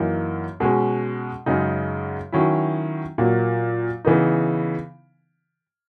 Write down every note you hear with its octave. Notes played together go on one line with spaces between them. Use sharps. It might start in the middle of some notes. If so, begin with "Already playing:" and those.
Already playing: F#2 E3 A#3 D#4
B2 G#3 C#4
F#2 C#3 G#3 D#4
D#3 F#3 C#4 E4
A#2 F#3 A#3
C#3 E3 B3 D#4